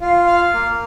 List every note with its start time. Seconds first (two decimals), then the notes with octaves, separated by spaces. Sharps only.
0.01 F4 F5
0.27 F5
0.54 A#3